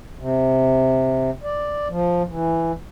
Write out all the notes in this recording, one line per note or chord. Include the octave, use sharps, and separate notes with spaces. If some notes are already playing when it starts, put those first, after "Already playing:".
C3
D5
F3
E3